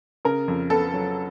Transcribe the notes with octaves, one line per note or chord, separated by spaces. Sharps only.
C#3 A#4
F2
B3 A4
F#3